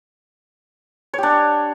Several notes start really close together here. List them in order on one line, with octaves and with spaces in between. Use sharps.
C#5 G4 D4